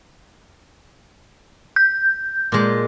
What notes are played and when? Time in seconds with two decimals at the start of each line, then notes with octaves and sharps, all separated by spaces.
1.76 G6
2.52 A#2 G#3